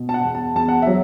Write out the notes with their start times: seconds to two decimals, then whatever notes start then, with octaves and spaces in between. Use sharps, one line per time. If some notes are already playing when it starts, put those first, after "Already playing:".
Already playing: B2
0.09 A5
0.14 F#5
0.24 E2
0.35 A5
0.55 E2 A5
0.68 F#5
0.82 F#3 E5